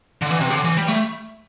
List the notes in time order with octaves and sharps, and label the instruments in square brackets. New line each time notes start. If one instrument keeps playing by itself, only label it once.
[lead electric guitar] D3
E3
C3
D3
E3
G3
A3